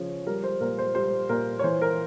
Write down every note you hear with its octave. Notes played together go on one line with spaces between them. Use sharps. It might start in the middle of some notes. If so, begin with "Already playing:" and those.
Already playing: C#3 F3 C#5
G3 A#4
C5
A#2 A#4
C5
G3 C5
A#2 A#4
C#5
E3 C5
A#4